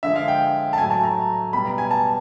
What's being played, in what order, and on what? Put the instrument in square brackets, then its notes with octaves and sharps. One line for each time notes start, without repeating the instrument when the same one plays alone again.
[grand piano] D3 F3 G#3 E5
F5
G5
A5
A2 F#3 A3 G#5
A5
A#5
B2 G3 B3 B5
A#5
G#5
A5